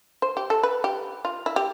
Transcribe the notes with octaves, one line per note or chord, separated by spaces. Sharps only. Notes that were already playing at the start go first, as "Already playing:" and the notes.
C5
G4
A4
B4
G4
F4
E4
G4